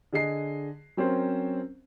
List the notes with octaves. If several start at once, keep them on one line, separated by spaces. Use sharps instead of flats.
D3 G#4 D#5 C7
F#3 C4 C#4 A#4 C5